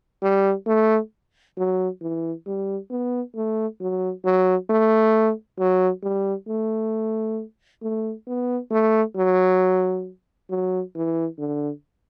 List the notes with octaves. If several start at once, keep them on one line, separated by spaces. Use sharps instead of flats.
G3
A3
F#3
E3
G3
B3
A3
F#3
F#3
A3
F#3
G3
A3
A3
B3
A3
F#3
F#3
E3
D3